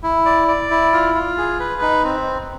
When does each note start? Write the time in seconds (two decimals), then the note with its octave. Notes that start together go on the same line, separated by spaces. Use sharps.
0.03 E4
0.26 D5
0.48 D5
0.70 E4
0.93 F4
1.14 F4
1.37 G#4
1.59 B4
1.82 D#4
2.04 C4